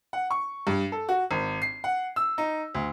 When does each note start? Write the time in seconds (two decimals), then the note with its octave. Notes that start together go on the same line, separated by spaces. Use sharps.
0.13 F#5
0.31 C#6
0.67 G2
0.92 A4
1.09 F#4
1.31 G#1
1.62 C7
1.84 F#5
2.16 E6
2.38 D#4
2.75 D2